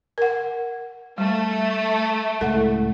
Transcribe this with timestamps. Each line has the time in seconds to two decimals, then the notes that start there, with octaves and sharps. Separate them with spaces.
0.18 A#4 F#5
1.18 G3 A3
2.41 C#2 A2 A4 F#5